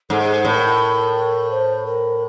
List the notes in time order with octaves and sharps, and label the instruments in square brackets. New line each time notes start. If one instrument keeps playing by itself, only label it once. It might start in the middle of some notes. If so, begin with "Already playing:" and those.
[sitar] G#2 [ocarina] A4
[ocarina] G#4
A4
[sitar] A2 [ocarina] C5
[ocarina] A#4
C5
A#4